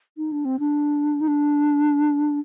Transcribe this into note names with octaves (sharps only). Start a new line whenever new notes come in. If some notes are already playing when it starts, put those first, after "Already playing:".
D#4
D4
C4
D4
D#4
D4